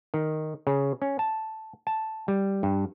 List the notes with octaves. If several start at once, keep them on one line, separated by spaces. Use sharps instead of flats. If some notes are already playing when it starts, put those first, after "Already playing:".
D#3
C#3
C#4
A5
A5
G3
G2